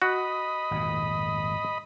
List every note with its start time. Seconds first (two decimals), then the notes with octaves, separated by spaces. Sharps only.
0.02 F#4 D#5 B5
0.71 G#1 F2 A#2